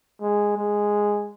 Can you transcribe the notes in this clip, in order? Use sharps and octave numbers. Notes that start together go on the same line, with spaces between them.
G#3
G#3